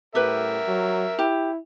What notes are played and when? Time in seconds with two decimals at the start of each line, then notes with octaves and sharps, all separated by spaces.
0.15 A2 G4 A#4 B4 E5
0.67 F#3
1.19 E4 G4